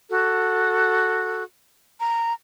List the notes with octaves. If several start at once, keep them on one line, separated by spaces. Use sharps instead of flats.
F#4 A4
A#5